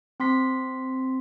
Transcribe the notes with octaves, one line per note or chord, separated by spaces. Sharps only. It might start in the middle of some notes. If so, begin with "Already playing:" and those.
C4 C6 B6